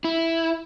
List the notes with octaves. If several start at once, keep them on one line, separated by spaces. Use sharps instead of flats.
E4